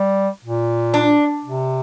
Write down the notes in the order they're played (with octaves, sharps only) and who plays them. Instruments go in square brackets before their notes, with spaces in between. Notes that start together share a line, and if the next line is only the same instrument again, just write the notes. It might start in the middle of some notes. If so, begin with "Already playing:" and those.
Already playing: [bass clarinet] G3
A#2
[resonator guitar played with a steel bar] D4
[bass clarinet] C3